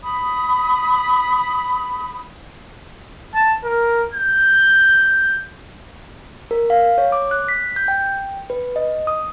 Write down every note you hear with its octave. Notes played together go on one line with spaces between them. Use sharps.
B5 D#6
A5
A#4
G6
A#4
F5
C#5
D6
F#6
B6
G6
G5
B4
D#5
D#6